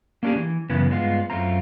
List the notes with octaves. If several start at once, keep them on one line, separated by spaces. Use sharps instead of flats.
A#3 C#4 D4 F4 G4 G#4
E3
F#2 C#3 E3 B3
G2 G#3 B3 F4
F#2 A3 C4 F4 A#5